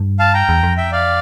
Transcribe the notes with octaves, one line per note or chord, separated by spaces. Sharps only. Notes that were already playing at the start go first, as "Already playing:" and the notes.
Already playing: G2
F5 A5
G5 A#5
E2
F2
E5 G5
D5 F5